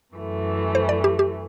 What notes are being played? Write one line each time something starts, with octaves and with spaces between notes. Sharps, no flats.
F#2 E3 A3
C5
D5
G4
G4